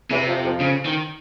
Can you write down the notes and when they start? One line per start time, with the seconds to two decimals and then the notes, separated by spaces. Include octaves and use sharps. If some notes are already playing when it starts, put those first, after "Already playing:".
0.11 E2 C3 E3
0.27 F2 F3
0.44 F2 F3
0.61 C#3
0.86 D#3